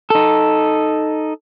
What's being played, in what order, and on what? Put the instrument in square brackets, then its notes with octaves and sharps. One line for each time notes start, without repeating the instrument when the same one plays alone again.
[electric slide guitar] D#4 A4